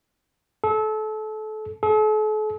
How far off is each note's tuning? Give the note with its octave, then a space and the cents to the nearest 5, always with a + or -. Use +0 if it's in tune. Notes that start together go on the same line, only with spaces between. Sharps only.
A4 -30
A4 -45